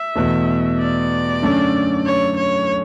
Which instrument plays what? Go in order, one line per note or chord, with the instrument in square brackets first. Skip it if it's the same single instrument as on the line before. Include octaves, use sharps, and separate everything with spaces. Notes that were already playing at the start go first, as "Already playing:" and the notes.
Already playing: [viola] E5
[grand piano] E2 B2 A3
[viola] D5
[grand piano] F#2 D3 A3 C#4
[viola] C#5
C#5